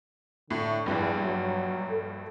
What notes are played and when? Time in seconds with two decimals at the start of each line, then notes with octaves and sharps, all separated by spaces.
0.51 A2 D3
0.86 A#1 E2 G2
1.22 F#3
1.91 A4